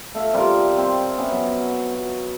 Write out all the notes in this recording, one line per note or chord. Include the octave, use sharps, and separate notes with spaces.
A3 E5 F5
C3 G3 F4 A#4
C4
B3 C#4 E5
F#3 C#4
F#4